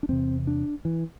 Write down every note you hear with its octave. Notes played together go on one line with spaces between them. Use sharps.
D4
E2 C3 C4
D4
E3